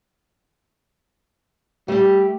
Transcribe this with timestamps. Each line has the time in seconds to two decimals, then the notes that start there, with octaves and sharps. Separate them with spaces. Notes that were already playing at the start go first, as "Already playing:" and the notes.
1.88 G3 A3 G4